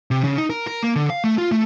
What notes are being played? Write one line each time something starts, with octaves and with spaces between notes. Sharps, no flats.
C3
C#3
D#4
A#4
A#4
A#3
D3
F5
A3
F4
A3